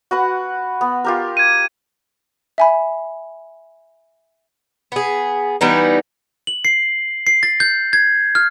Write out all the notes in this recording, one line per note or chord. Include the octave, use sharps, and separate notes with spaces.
F#4 B4 F#5
B3
F4 G4 A#4
G#6 D#7
E5 G#5 B5
B3 G#4
E3 G3 B3 D#4
F#7
C7
C7
A6
G6
G#6
F6